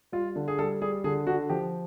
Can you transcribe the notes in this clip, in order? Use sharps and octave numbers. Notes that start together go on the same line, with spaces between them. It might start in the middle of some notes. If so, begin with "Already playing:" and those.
G3 F4
D3
G#4
G3 A4
G3 G#4
D3 G#4
D3 F#4
F3 G4